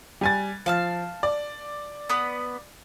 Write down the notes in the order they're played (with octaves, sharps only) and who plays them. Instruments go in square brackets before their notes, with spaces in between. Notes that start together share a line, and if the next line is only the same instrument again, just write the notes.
[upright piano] G3 G#5 A6
[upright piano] F3 [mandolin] F5 A5 F6
[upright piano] D5
[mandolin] B3 B4 D#6